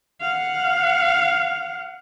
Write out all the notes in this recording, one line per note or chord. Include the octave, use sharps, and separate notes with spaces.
F5 F#5